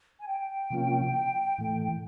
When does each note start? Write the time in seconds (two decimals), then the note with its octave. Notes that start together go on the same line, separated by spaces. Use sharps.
0.19 G#5
0.27 G5
0.70 C3 F3 A#3 C#4 F4
1.58 A2 E3 A3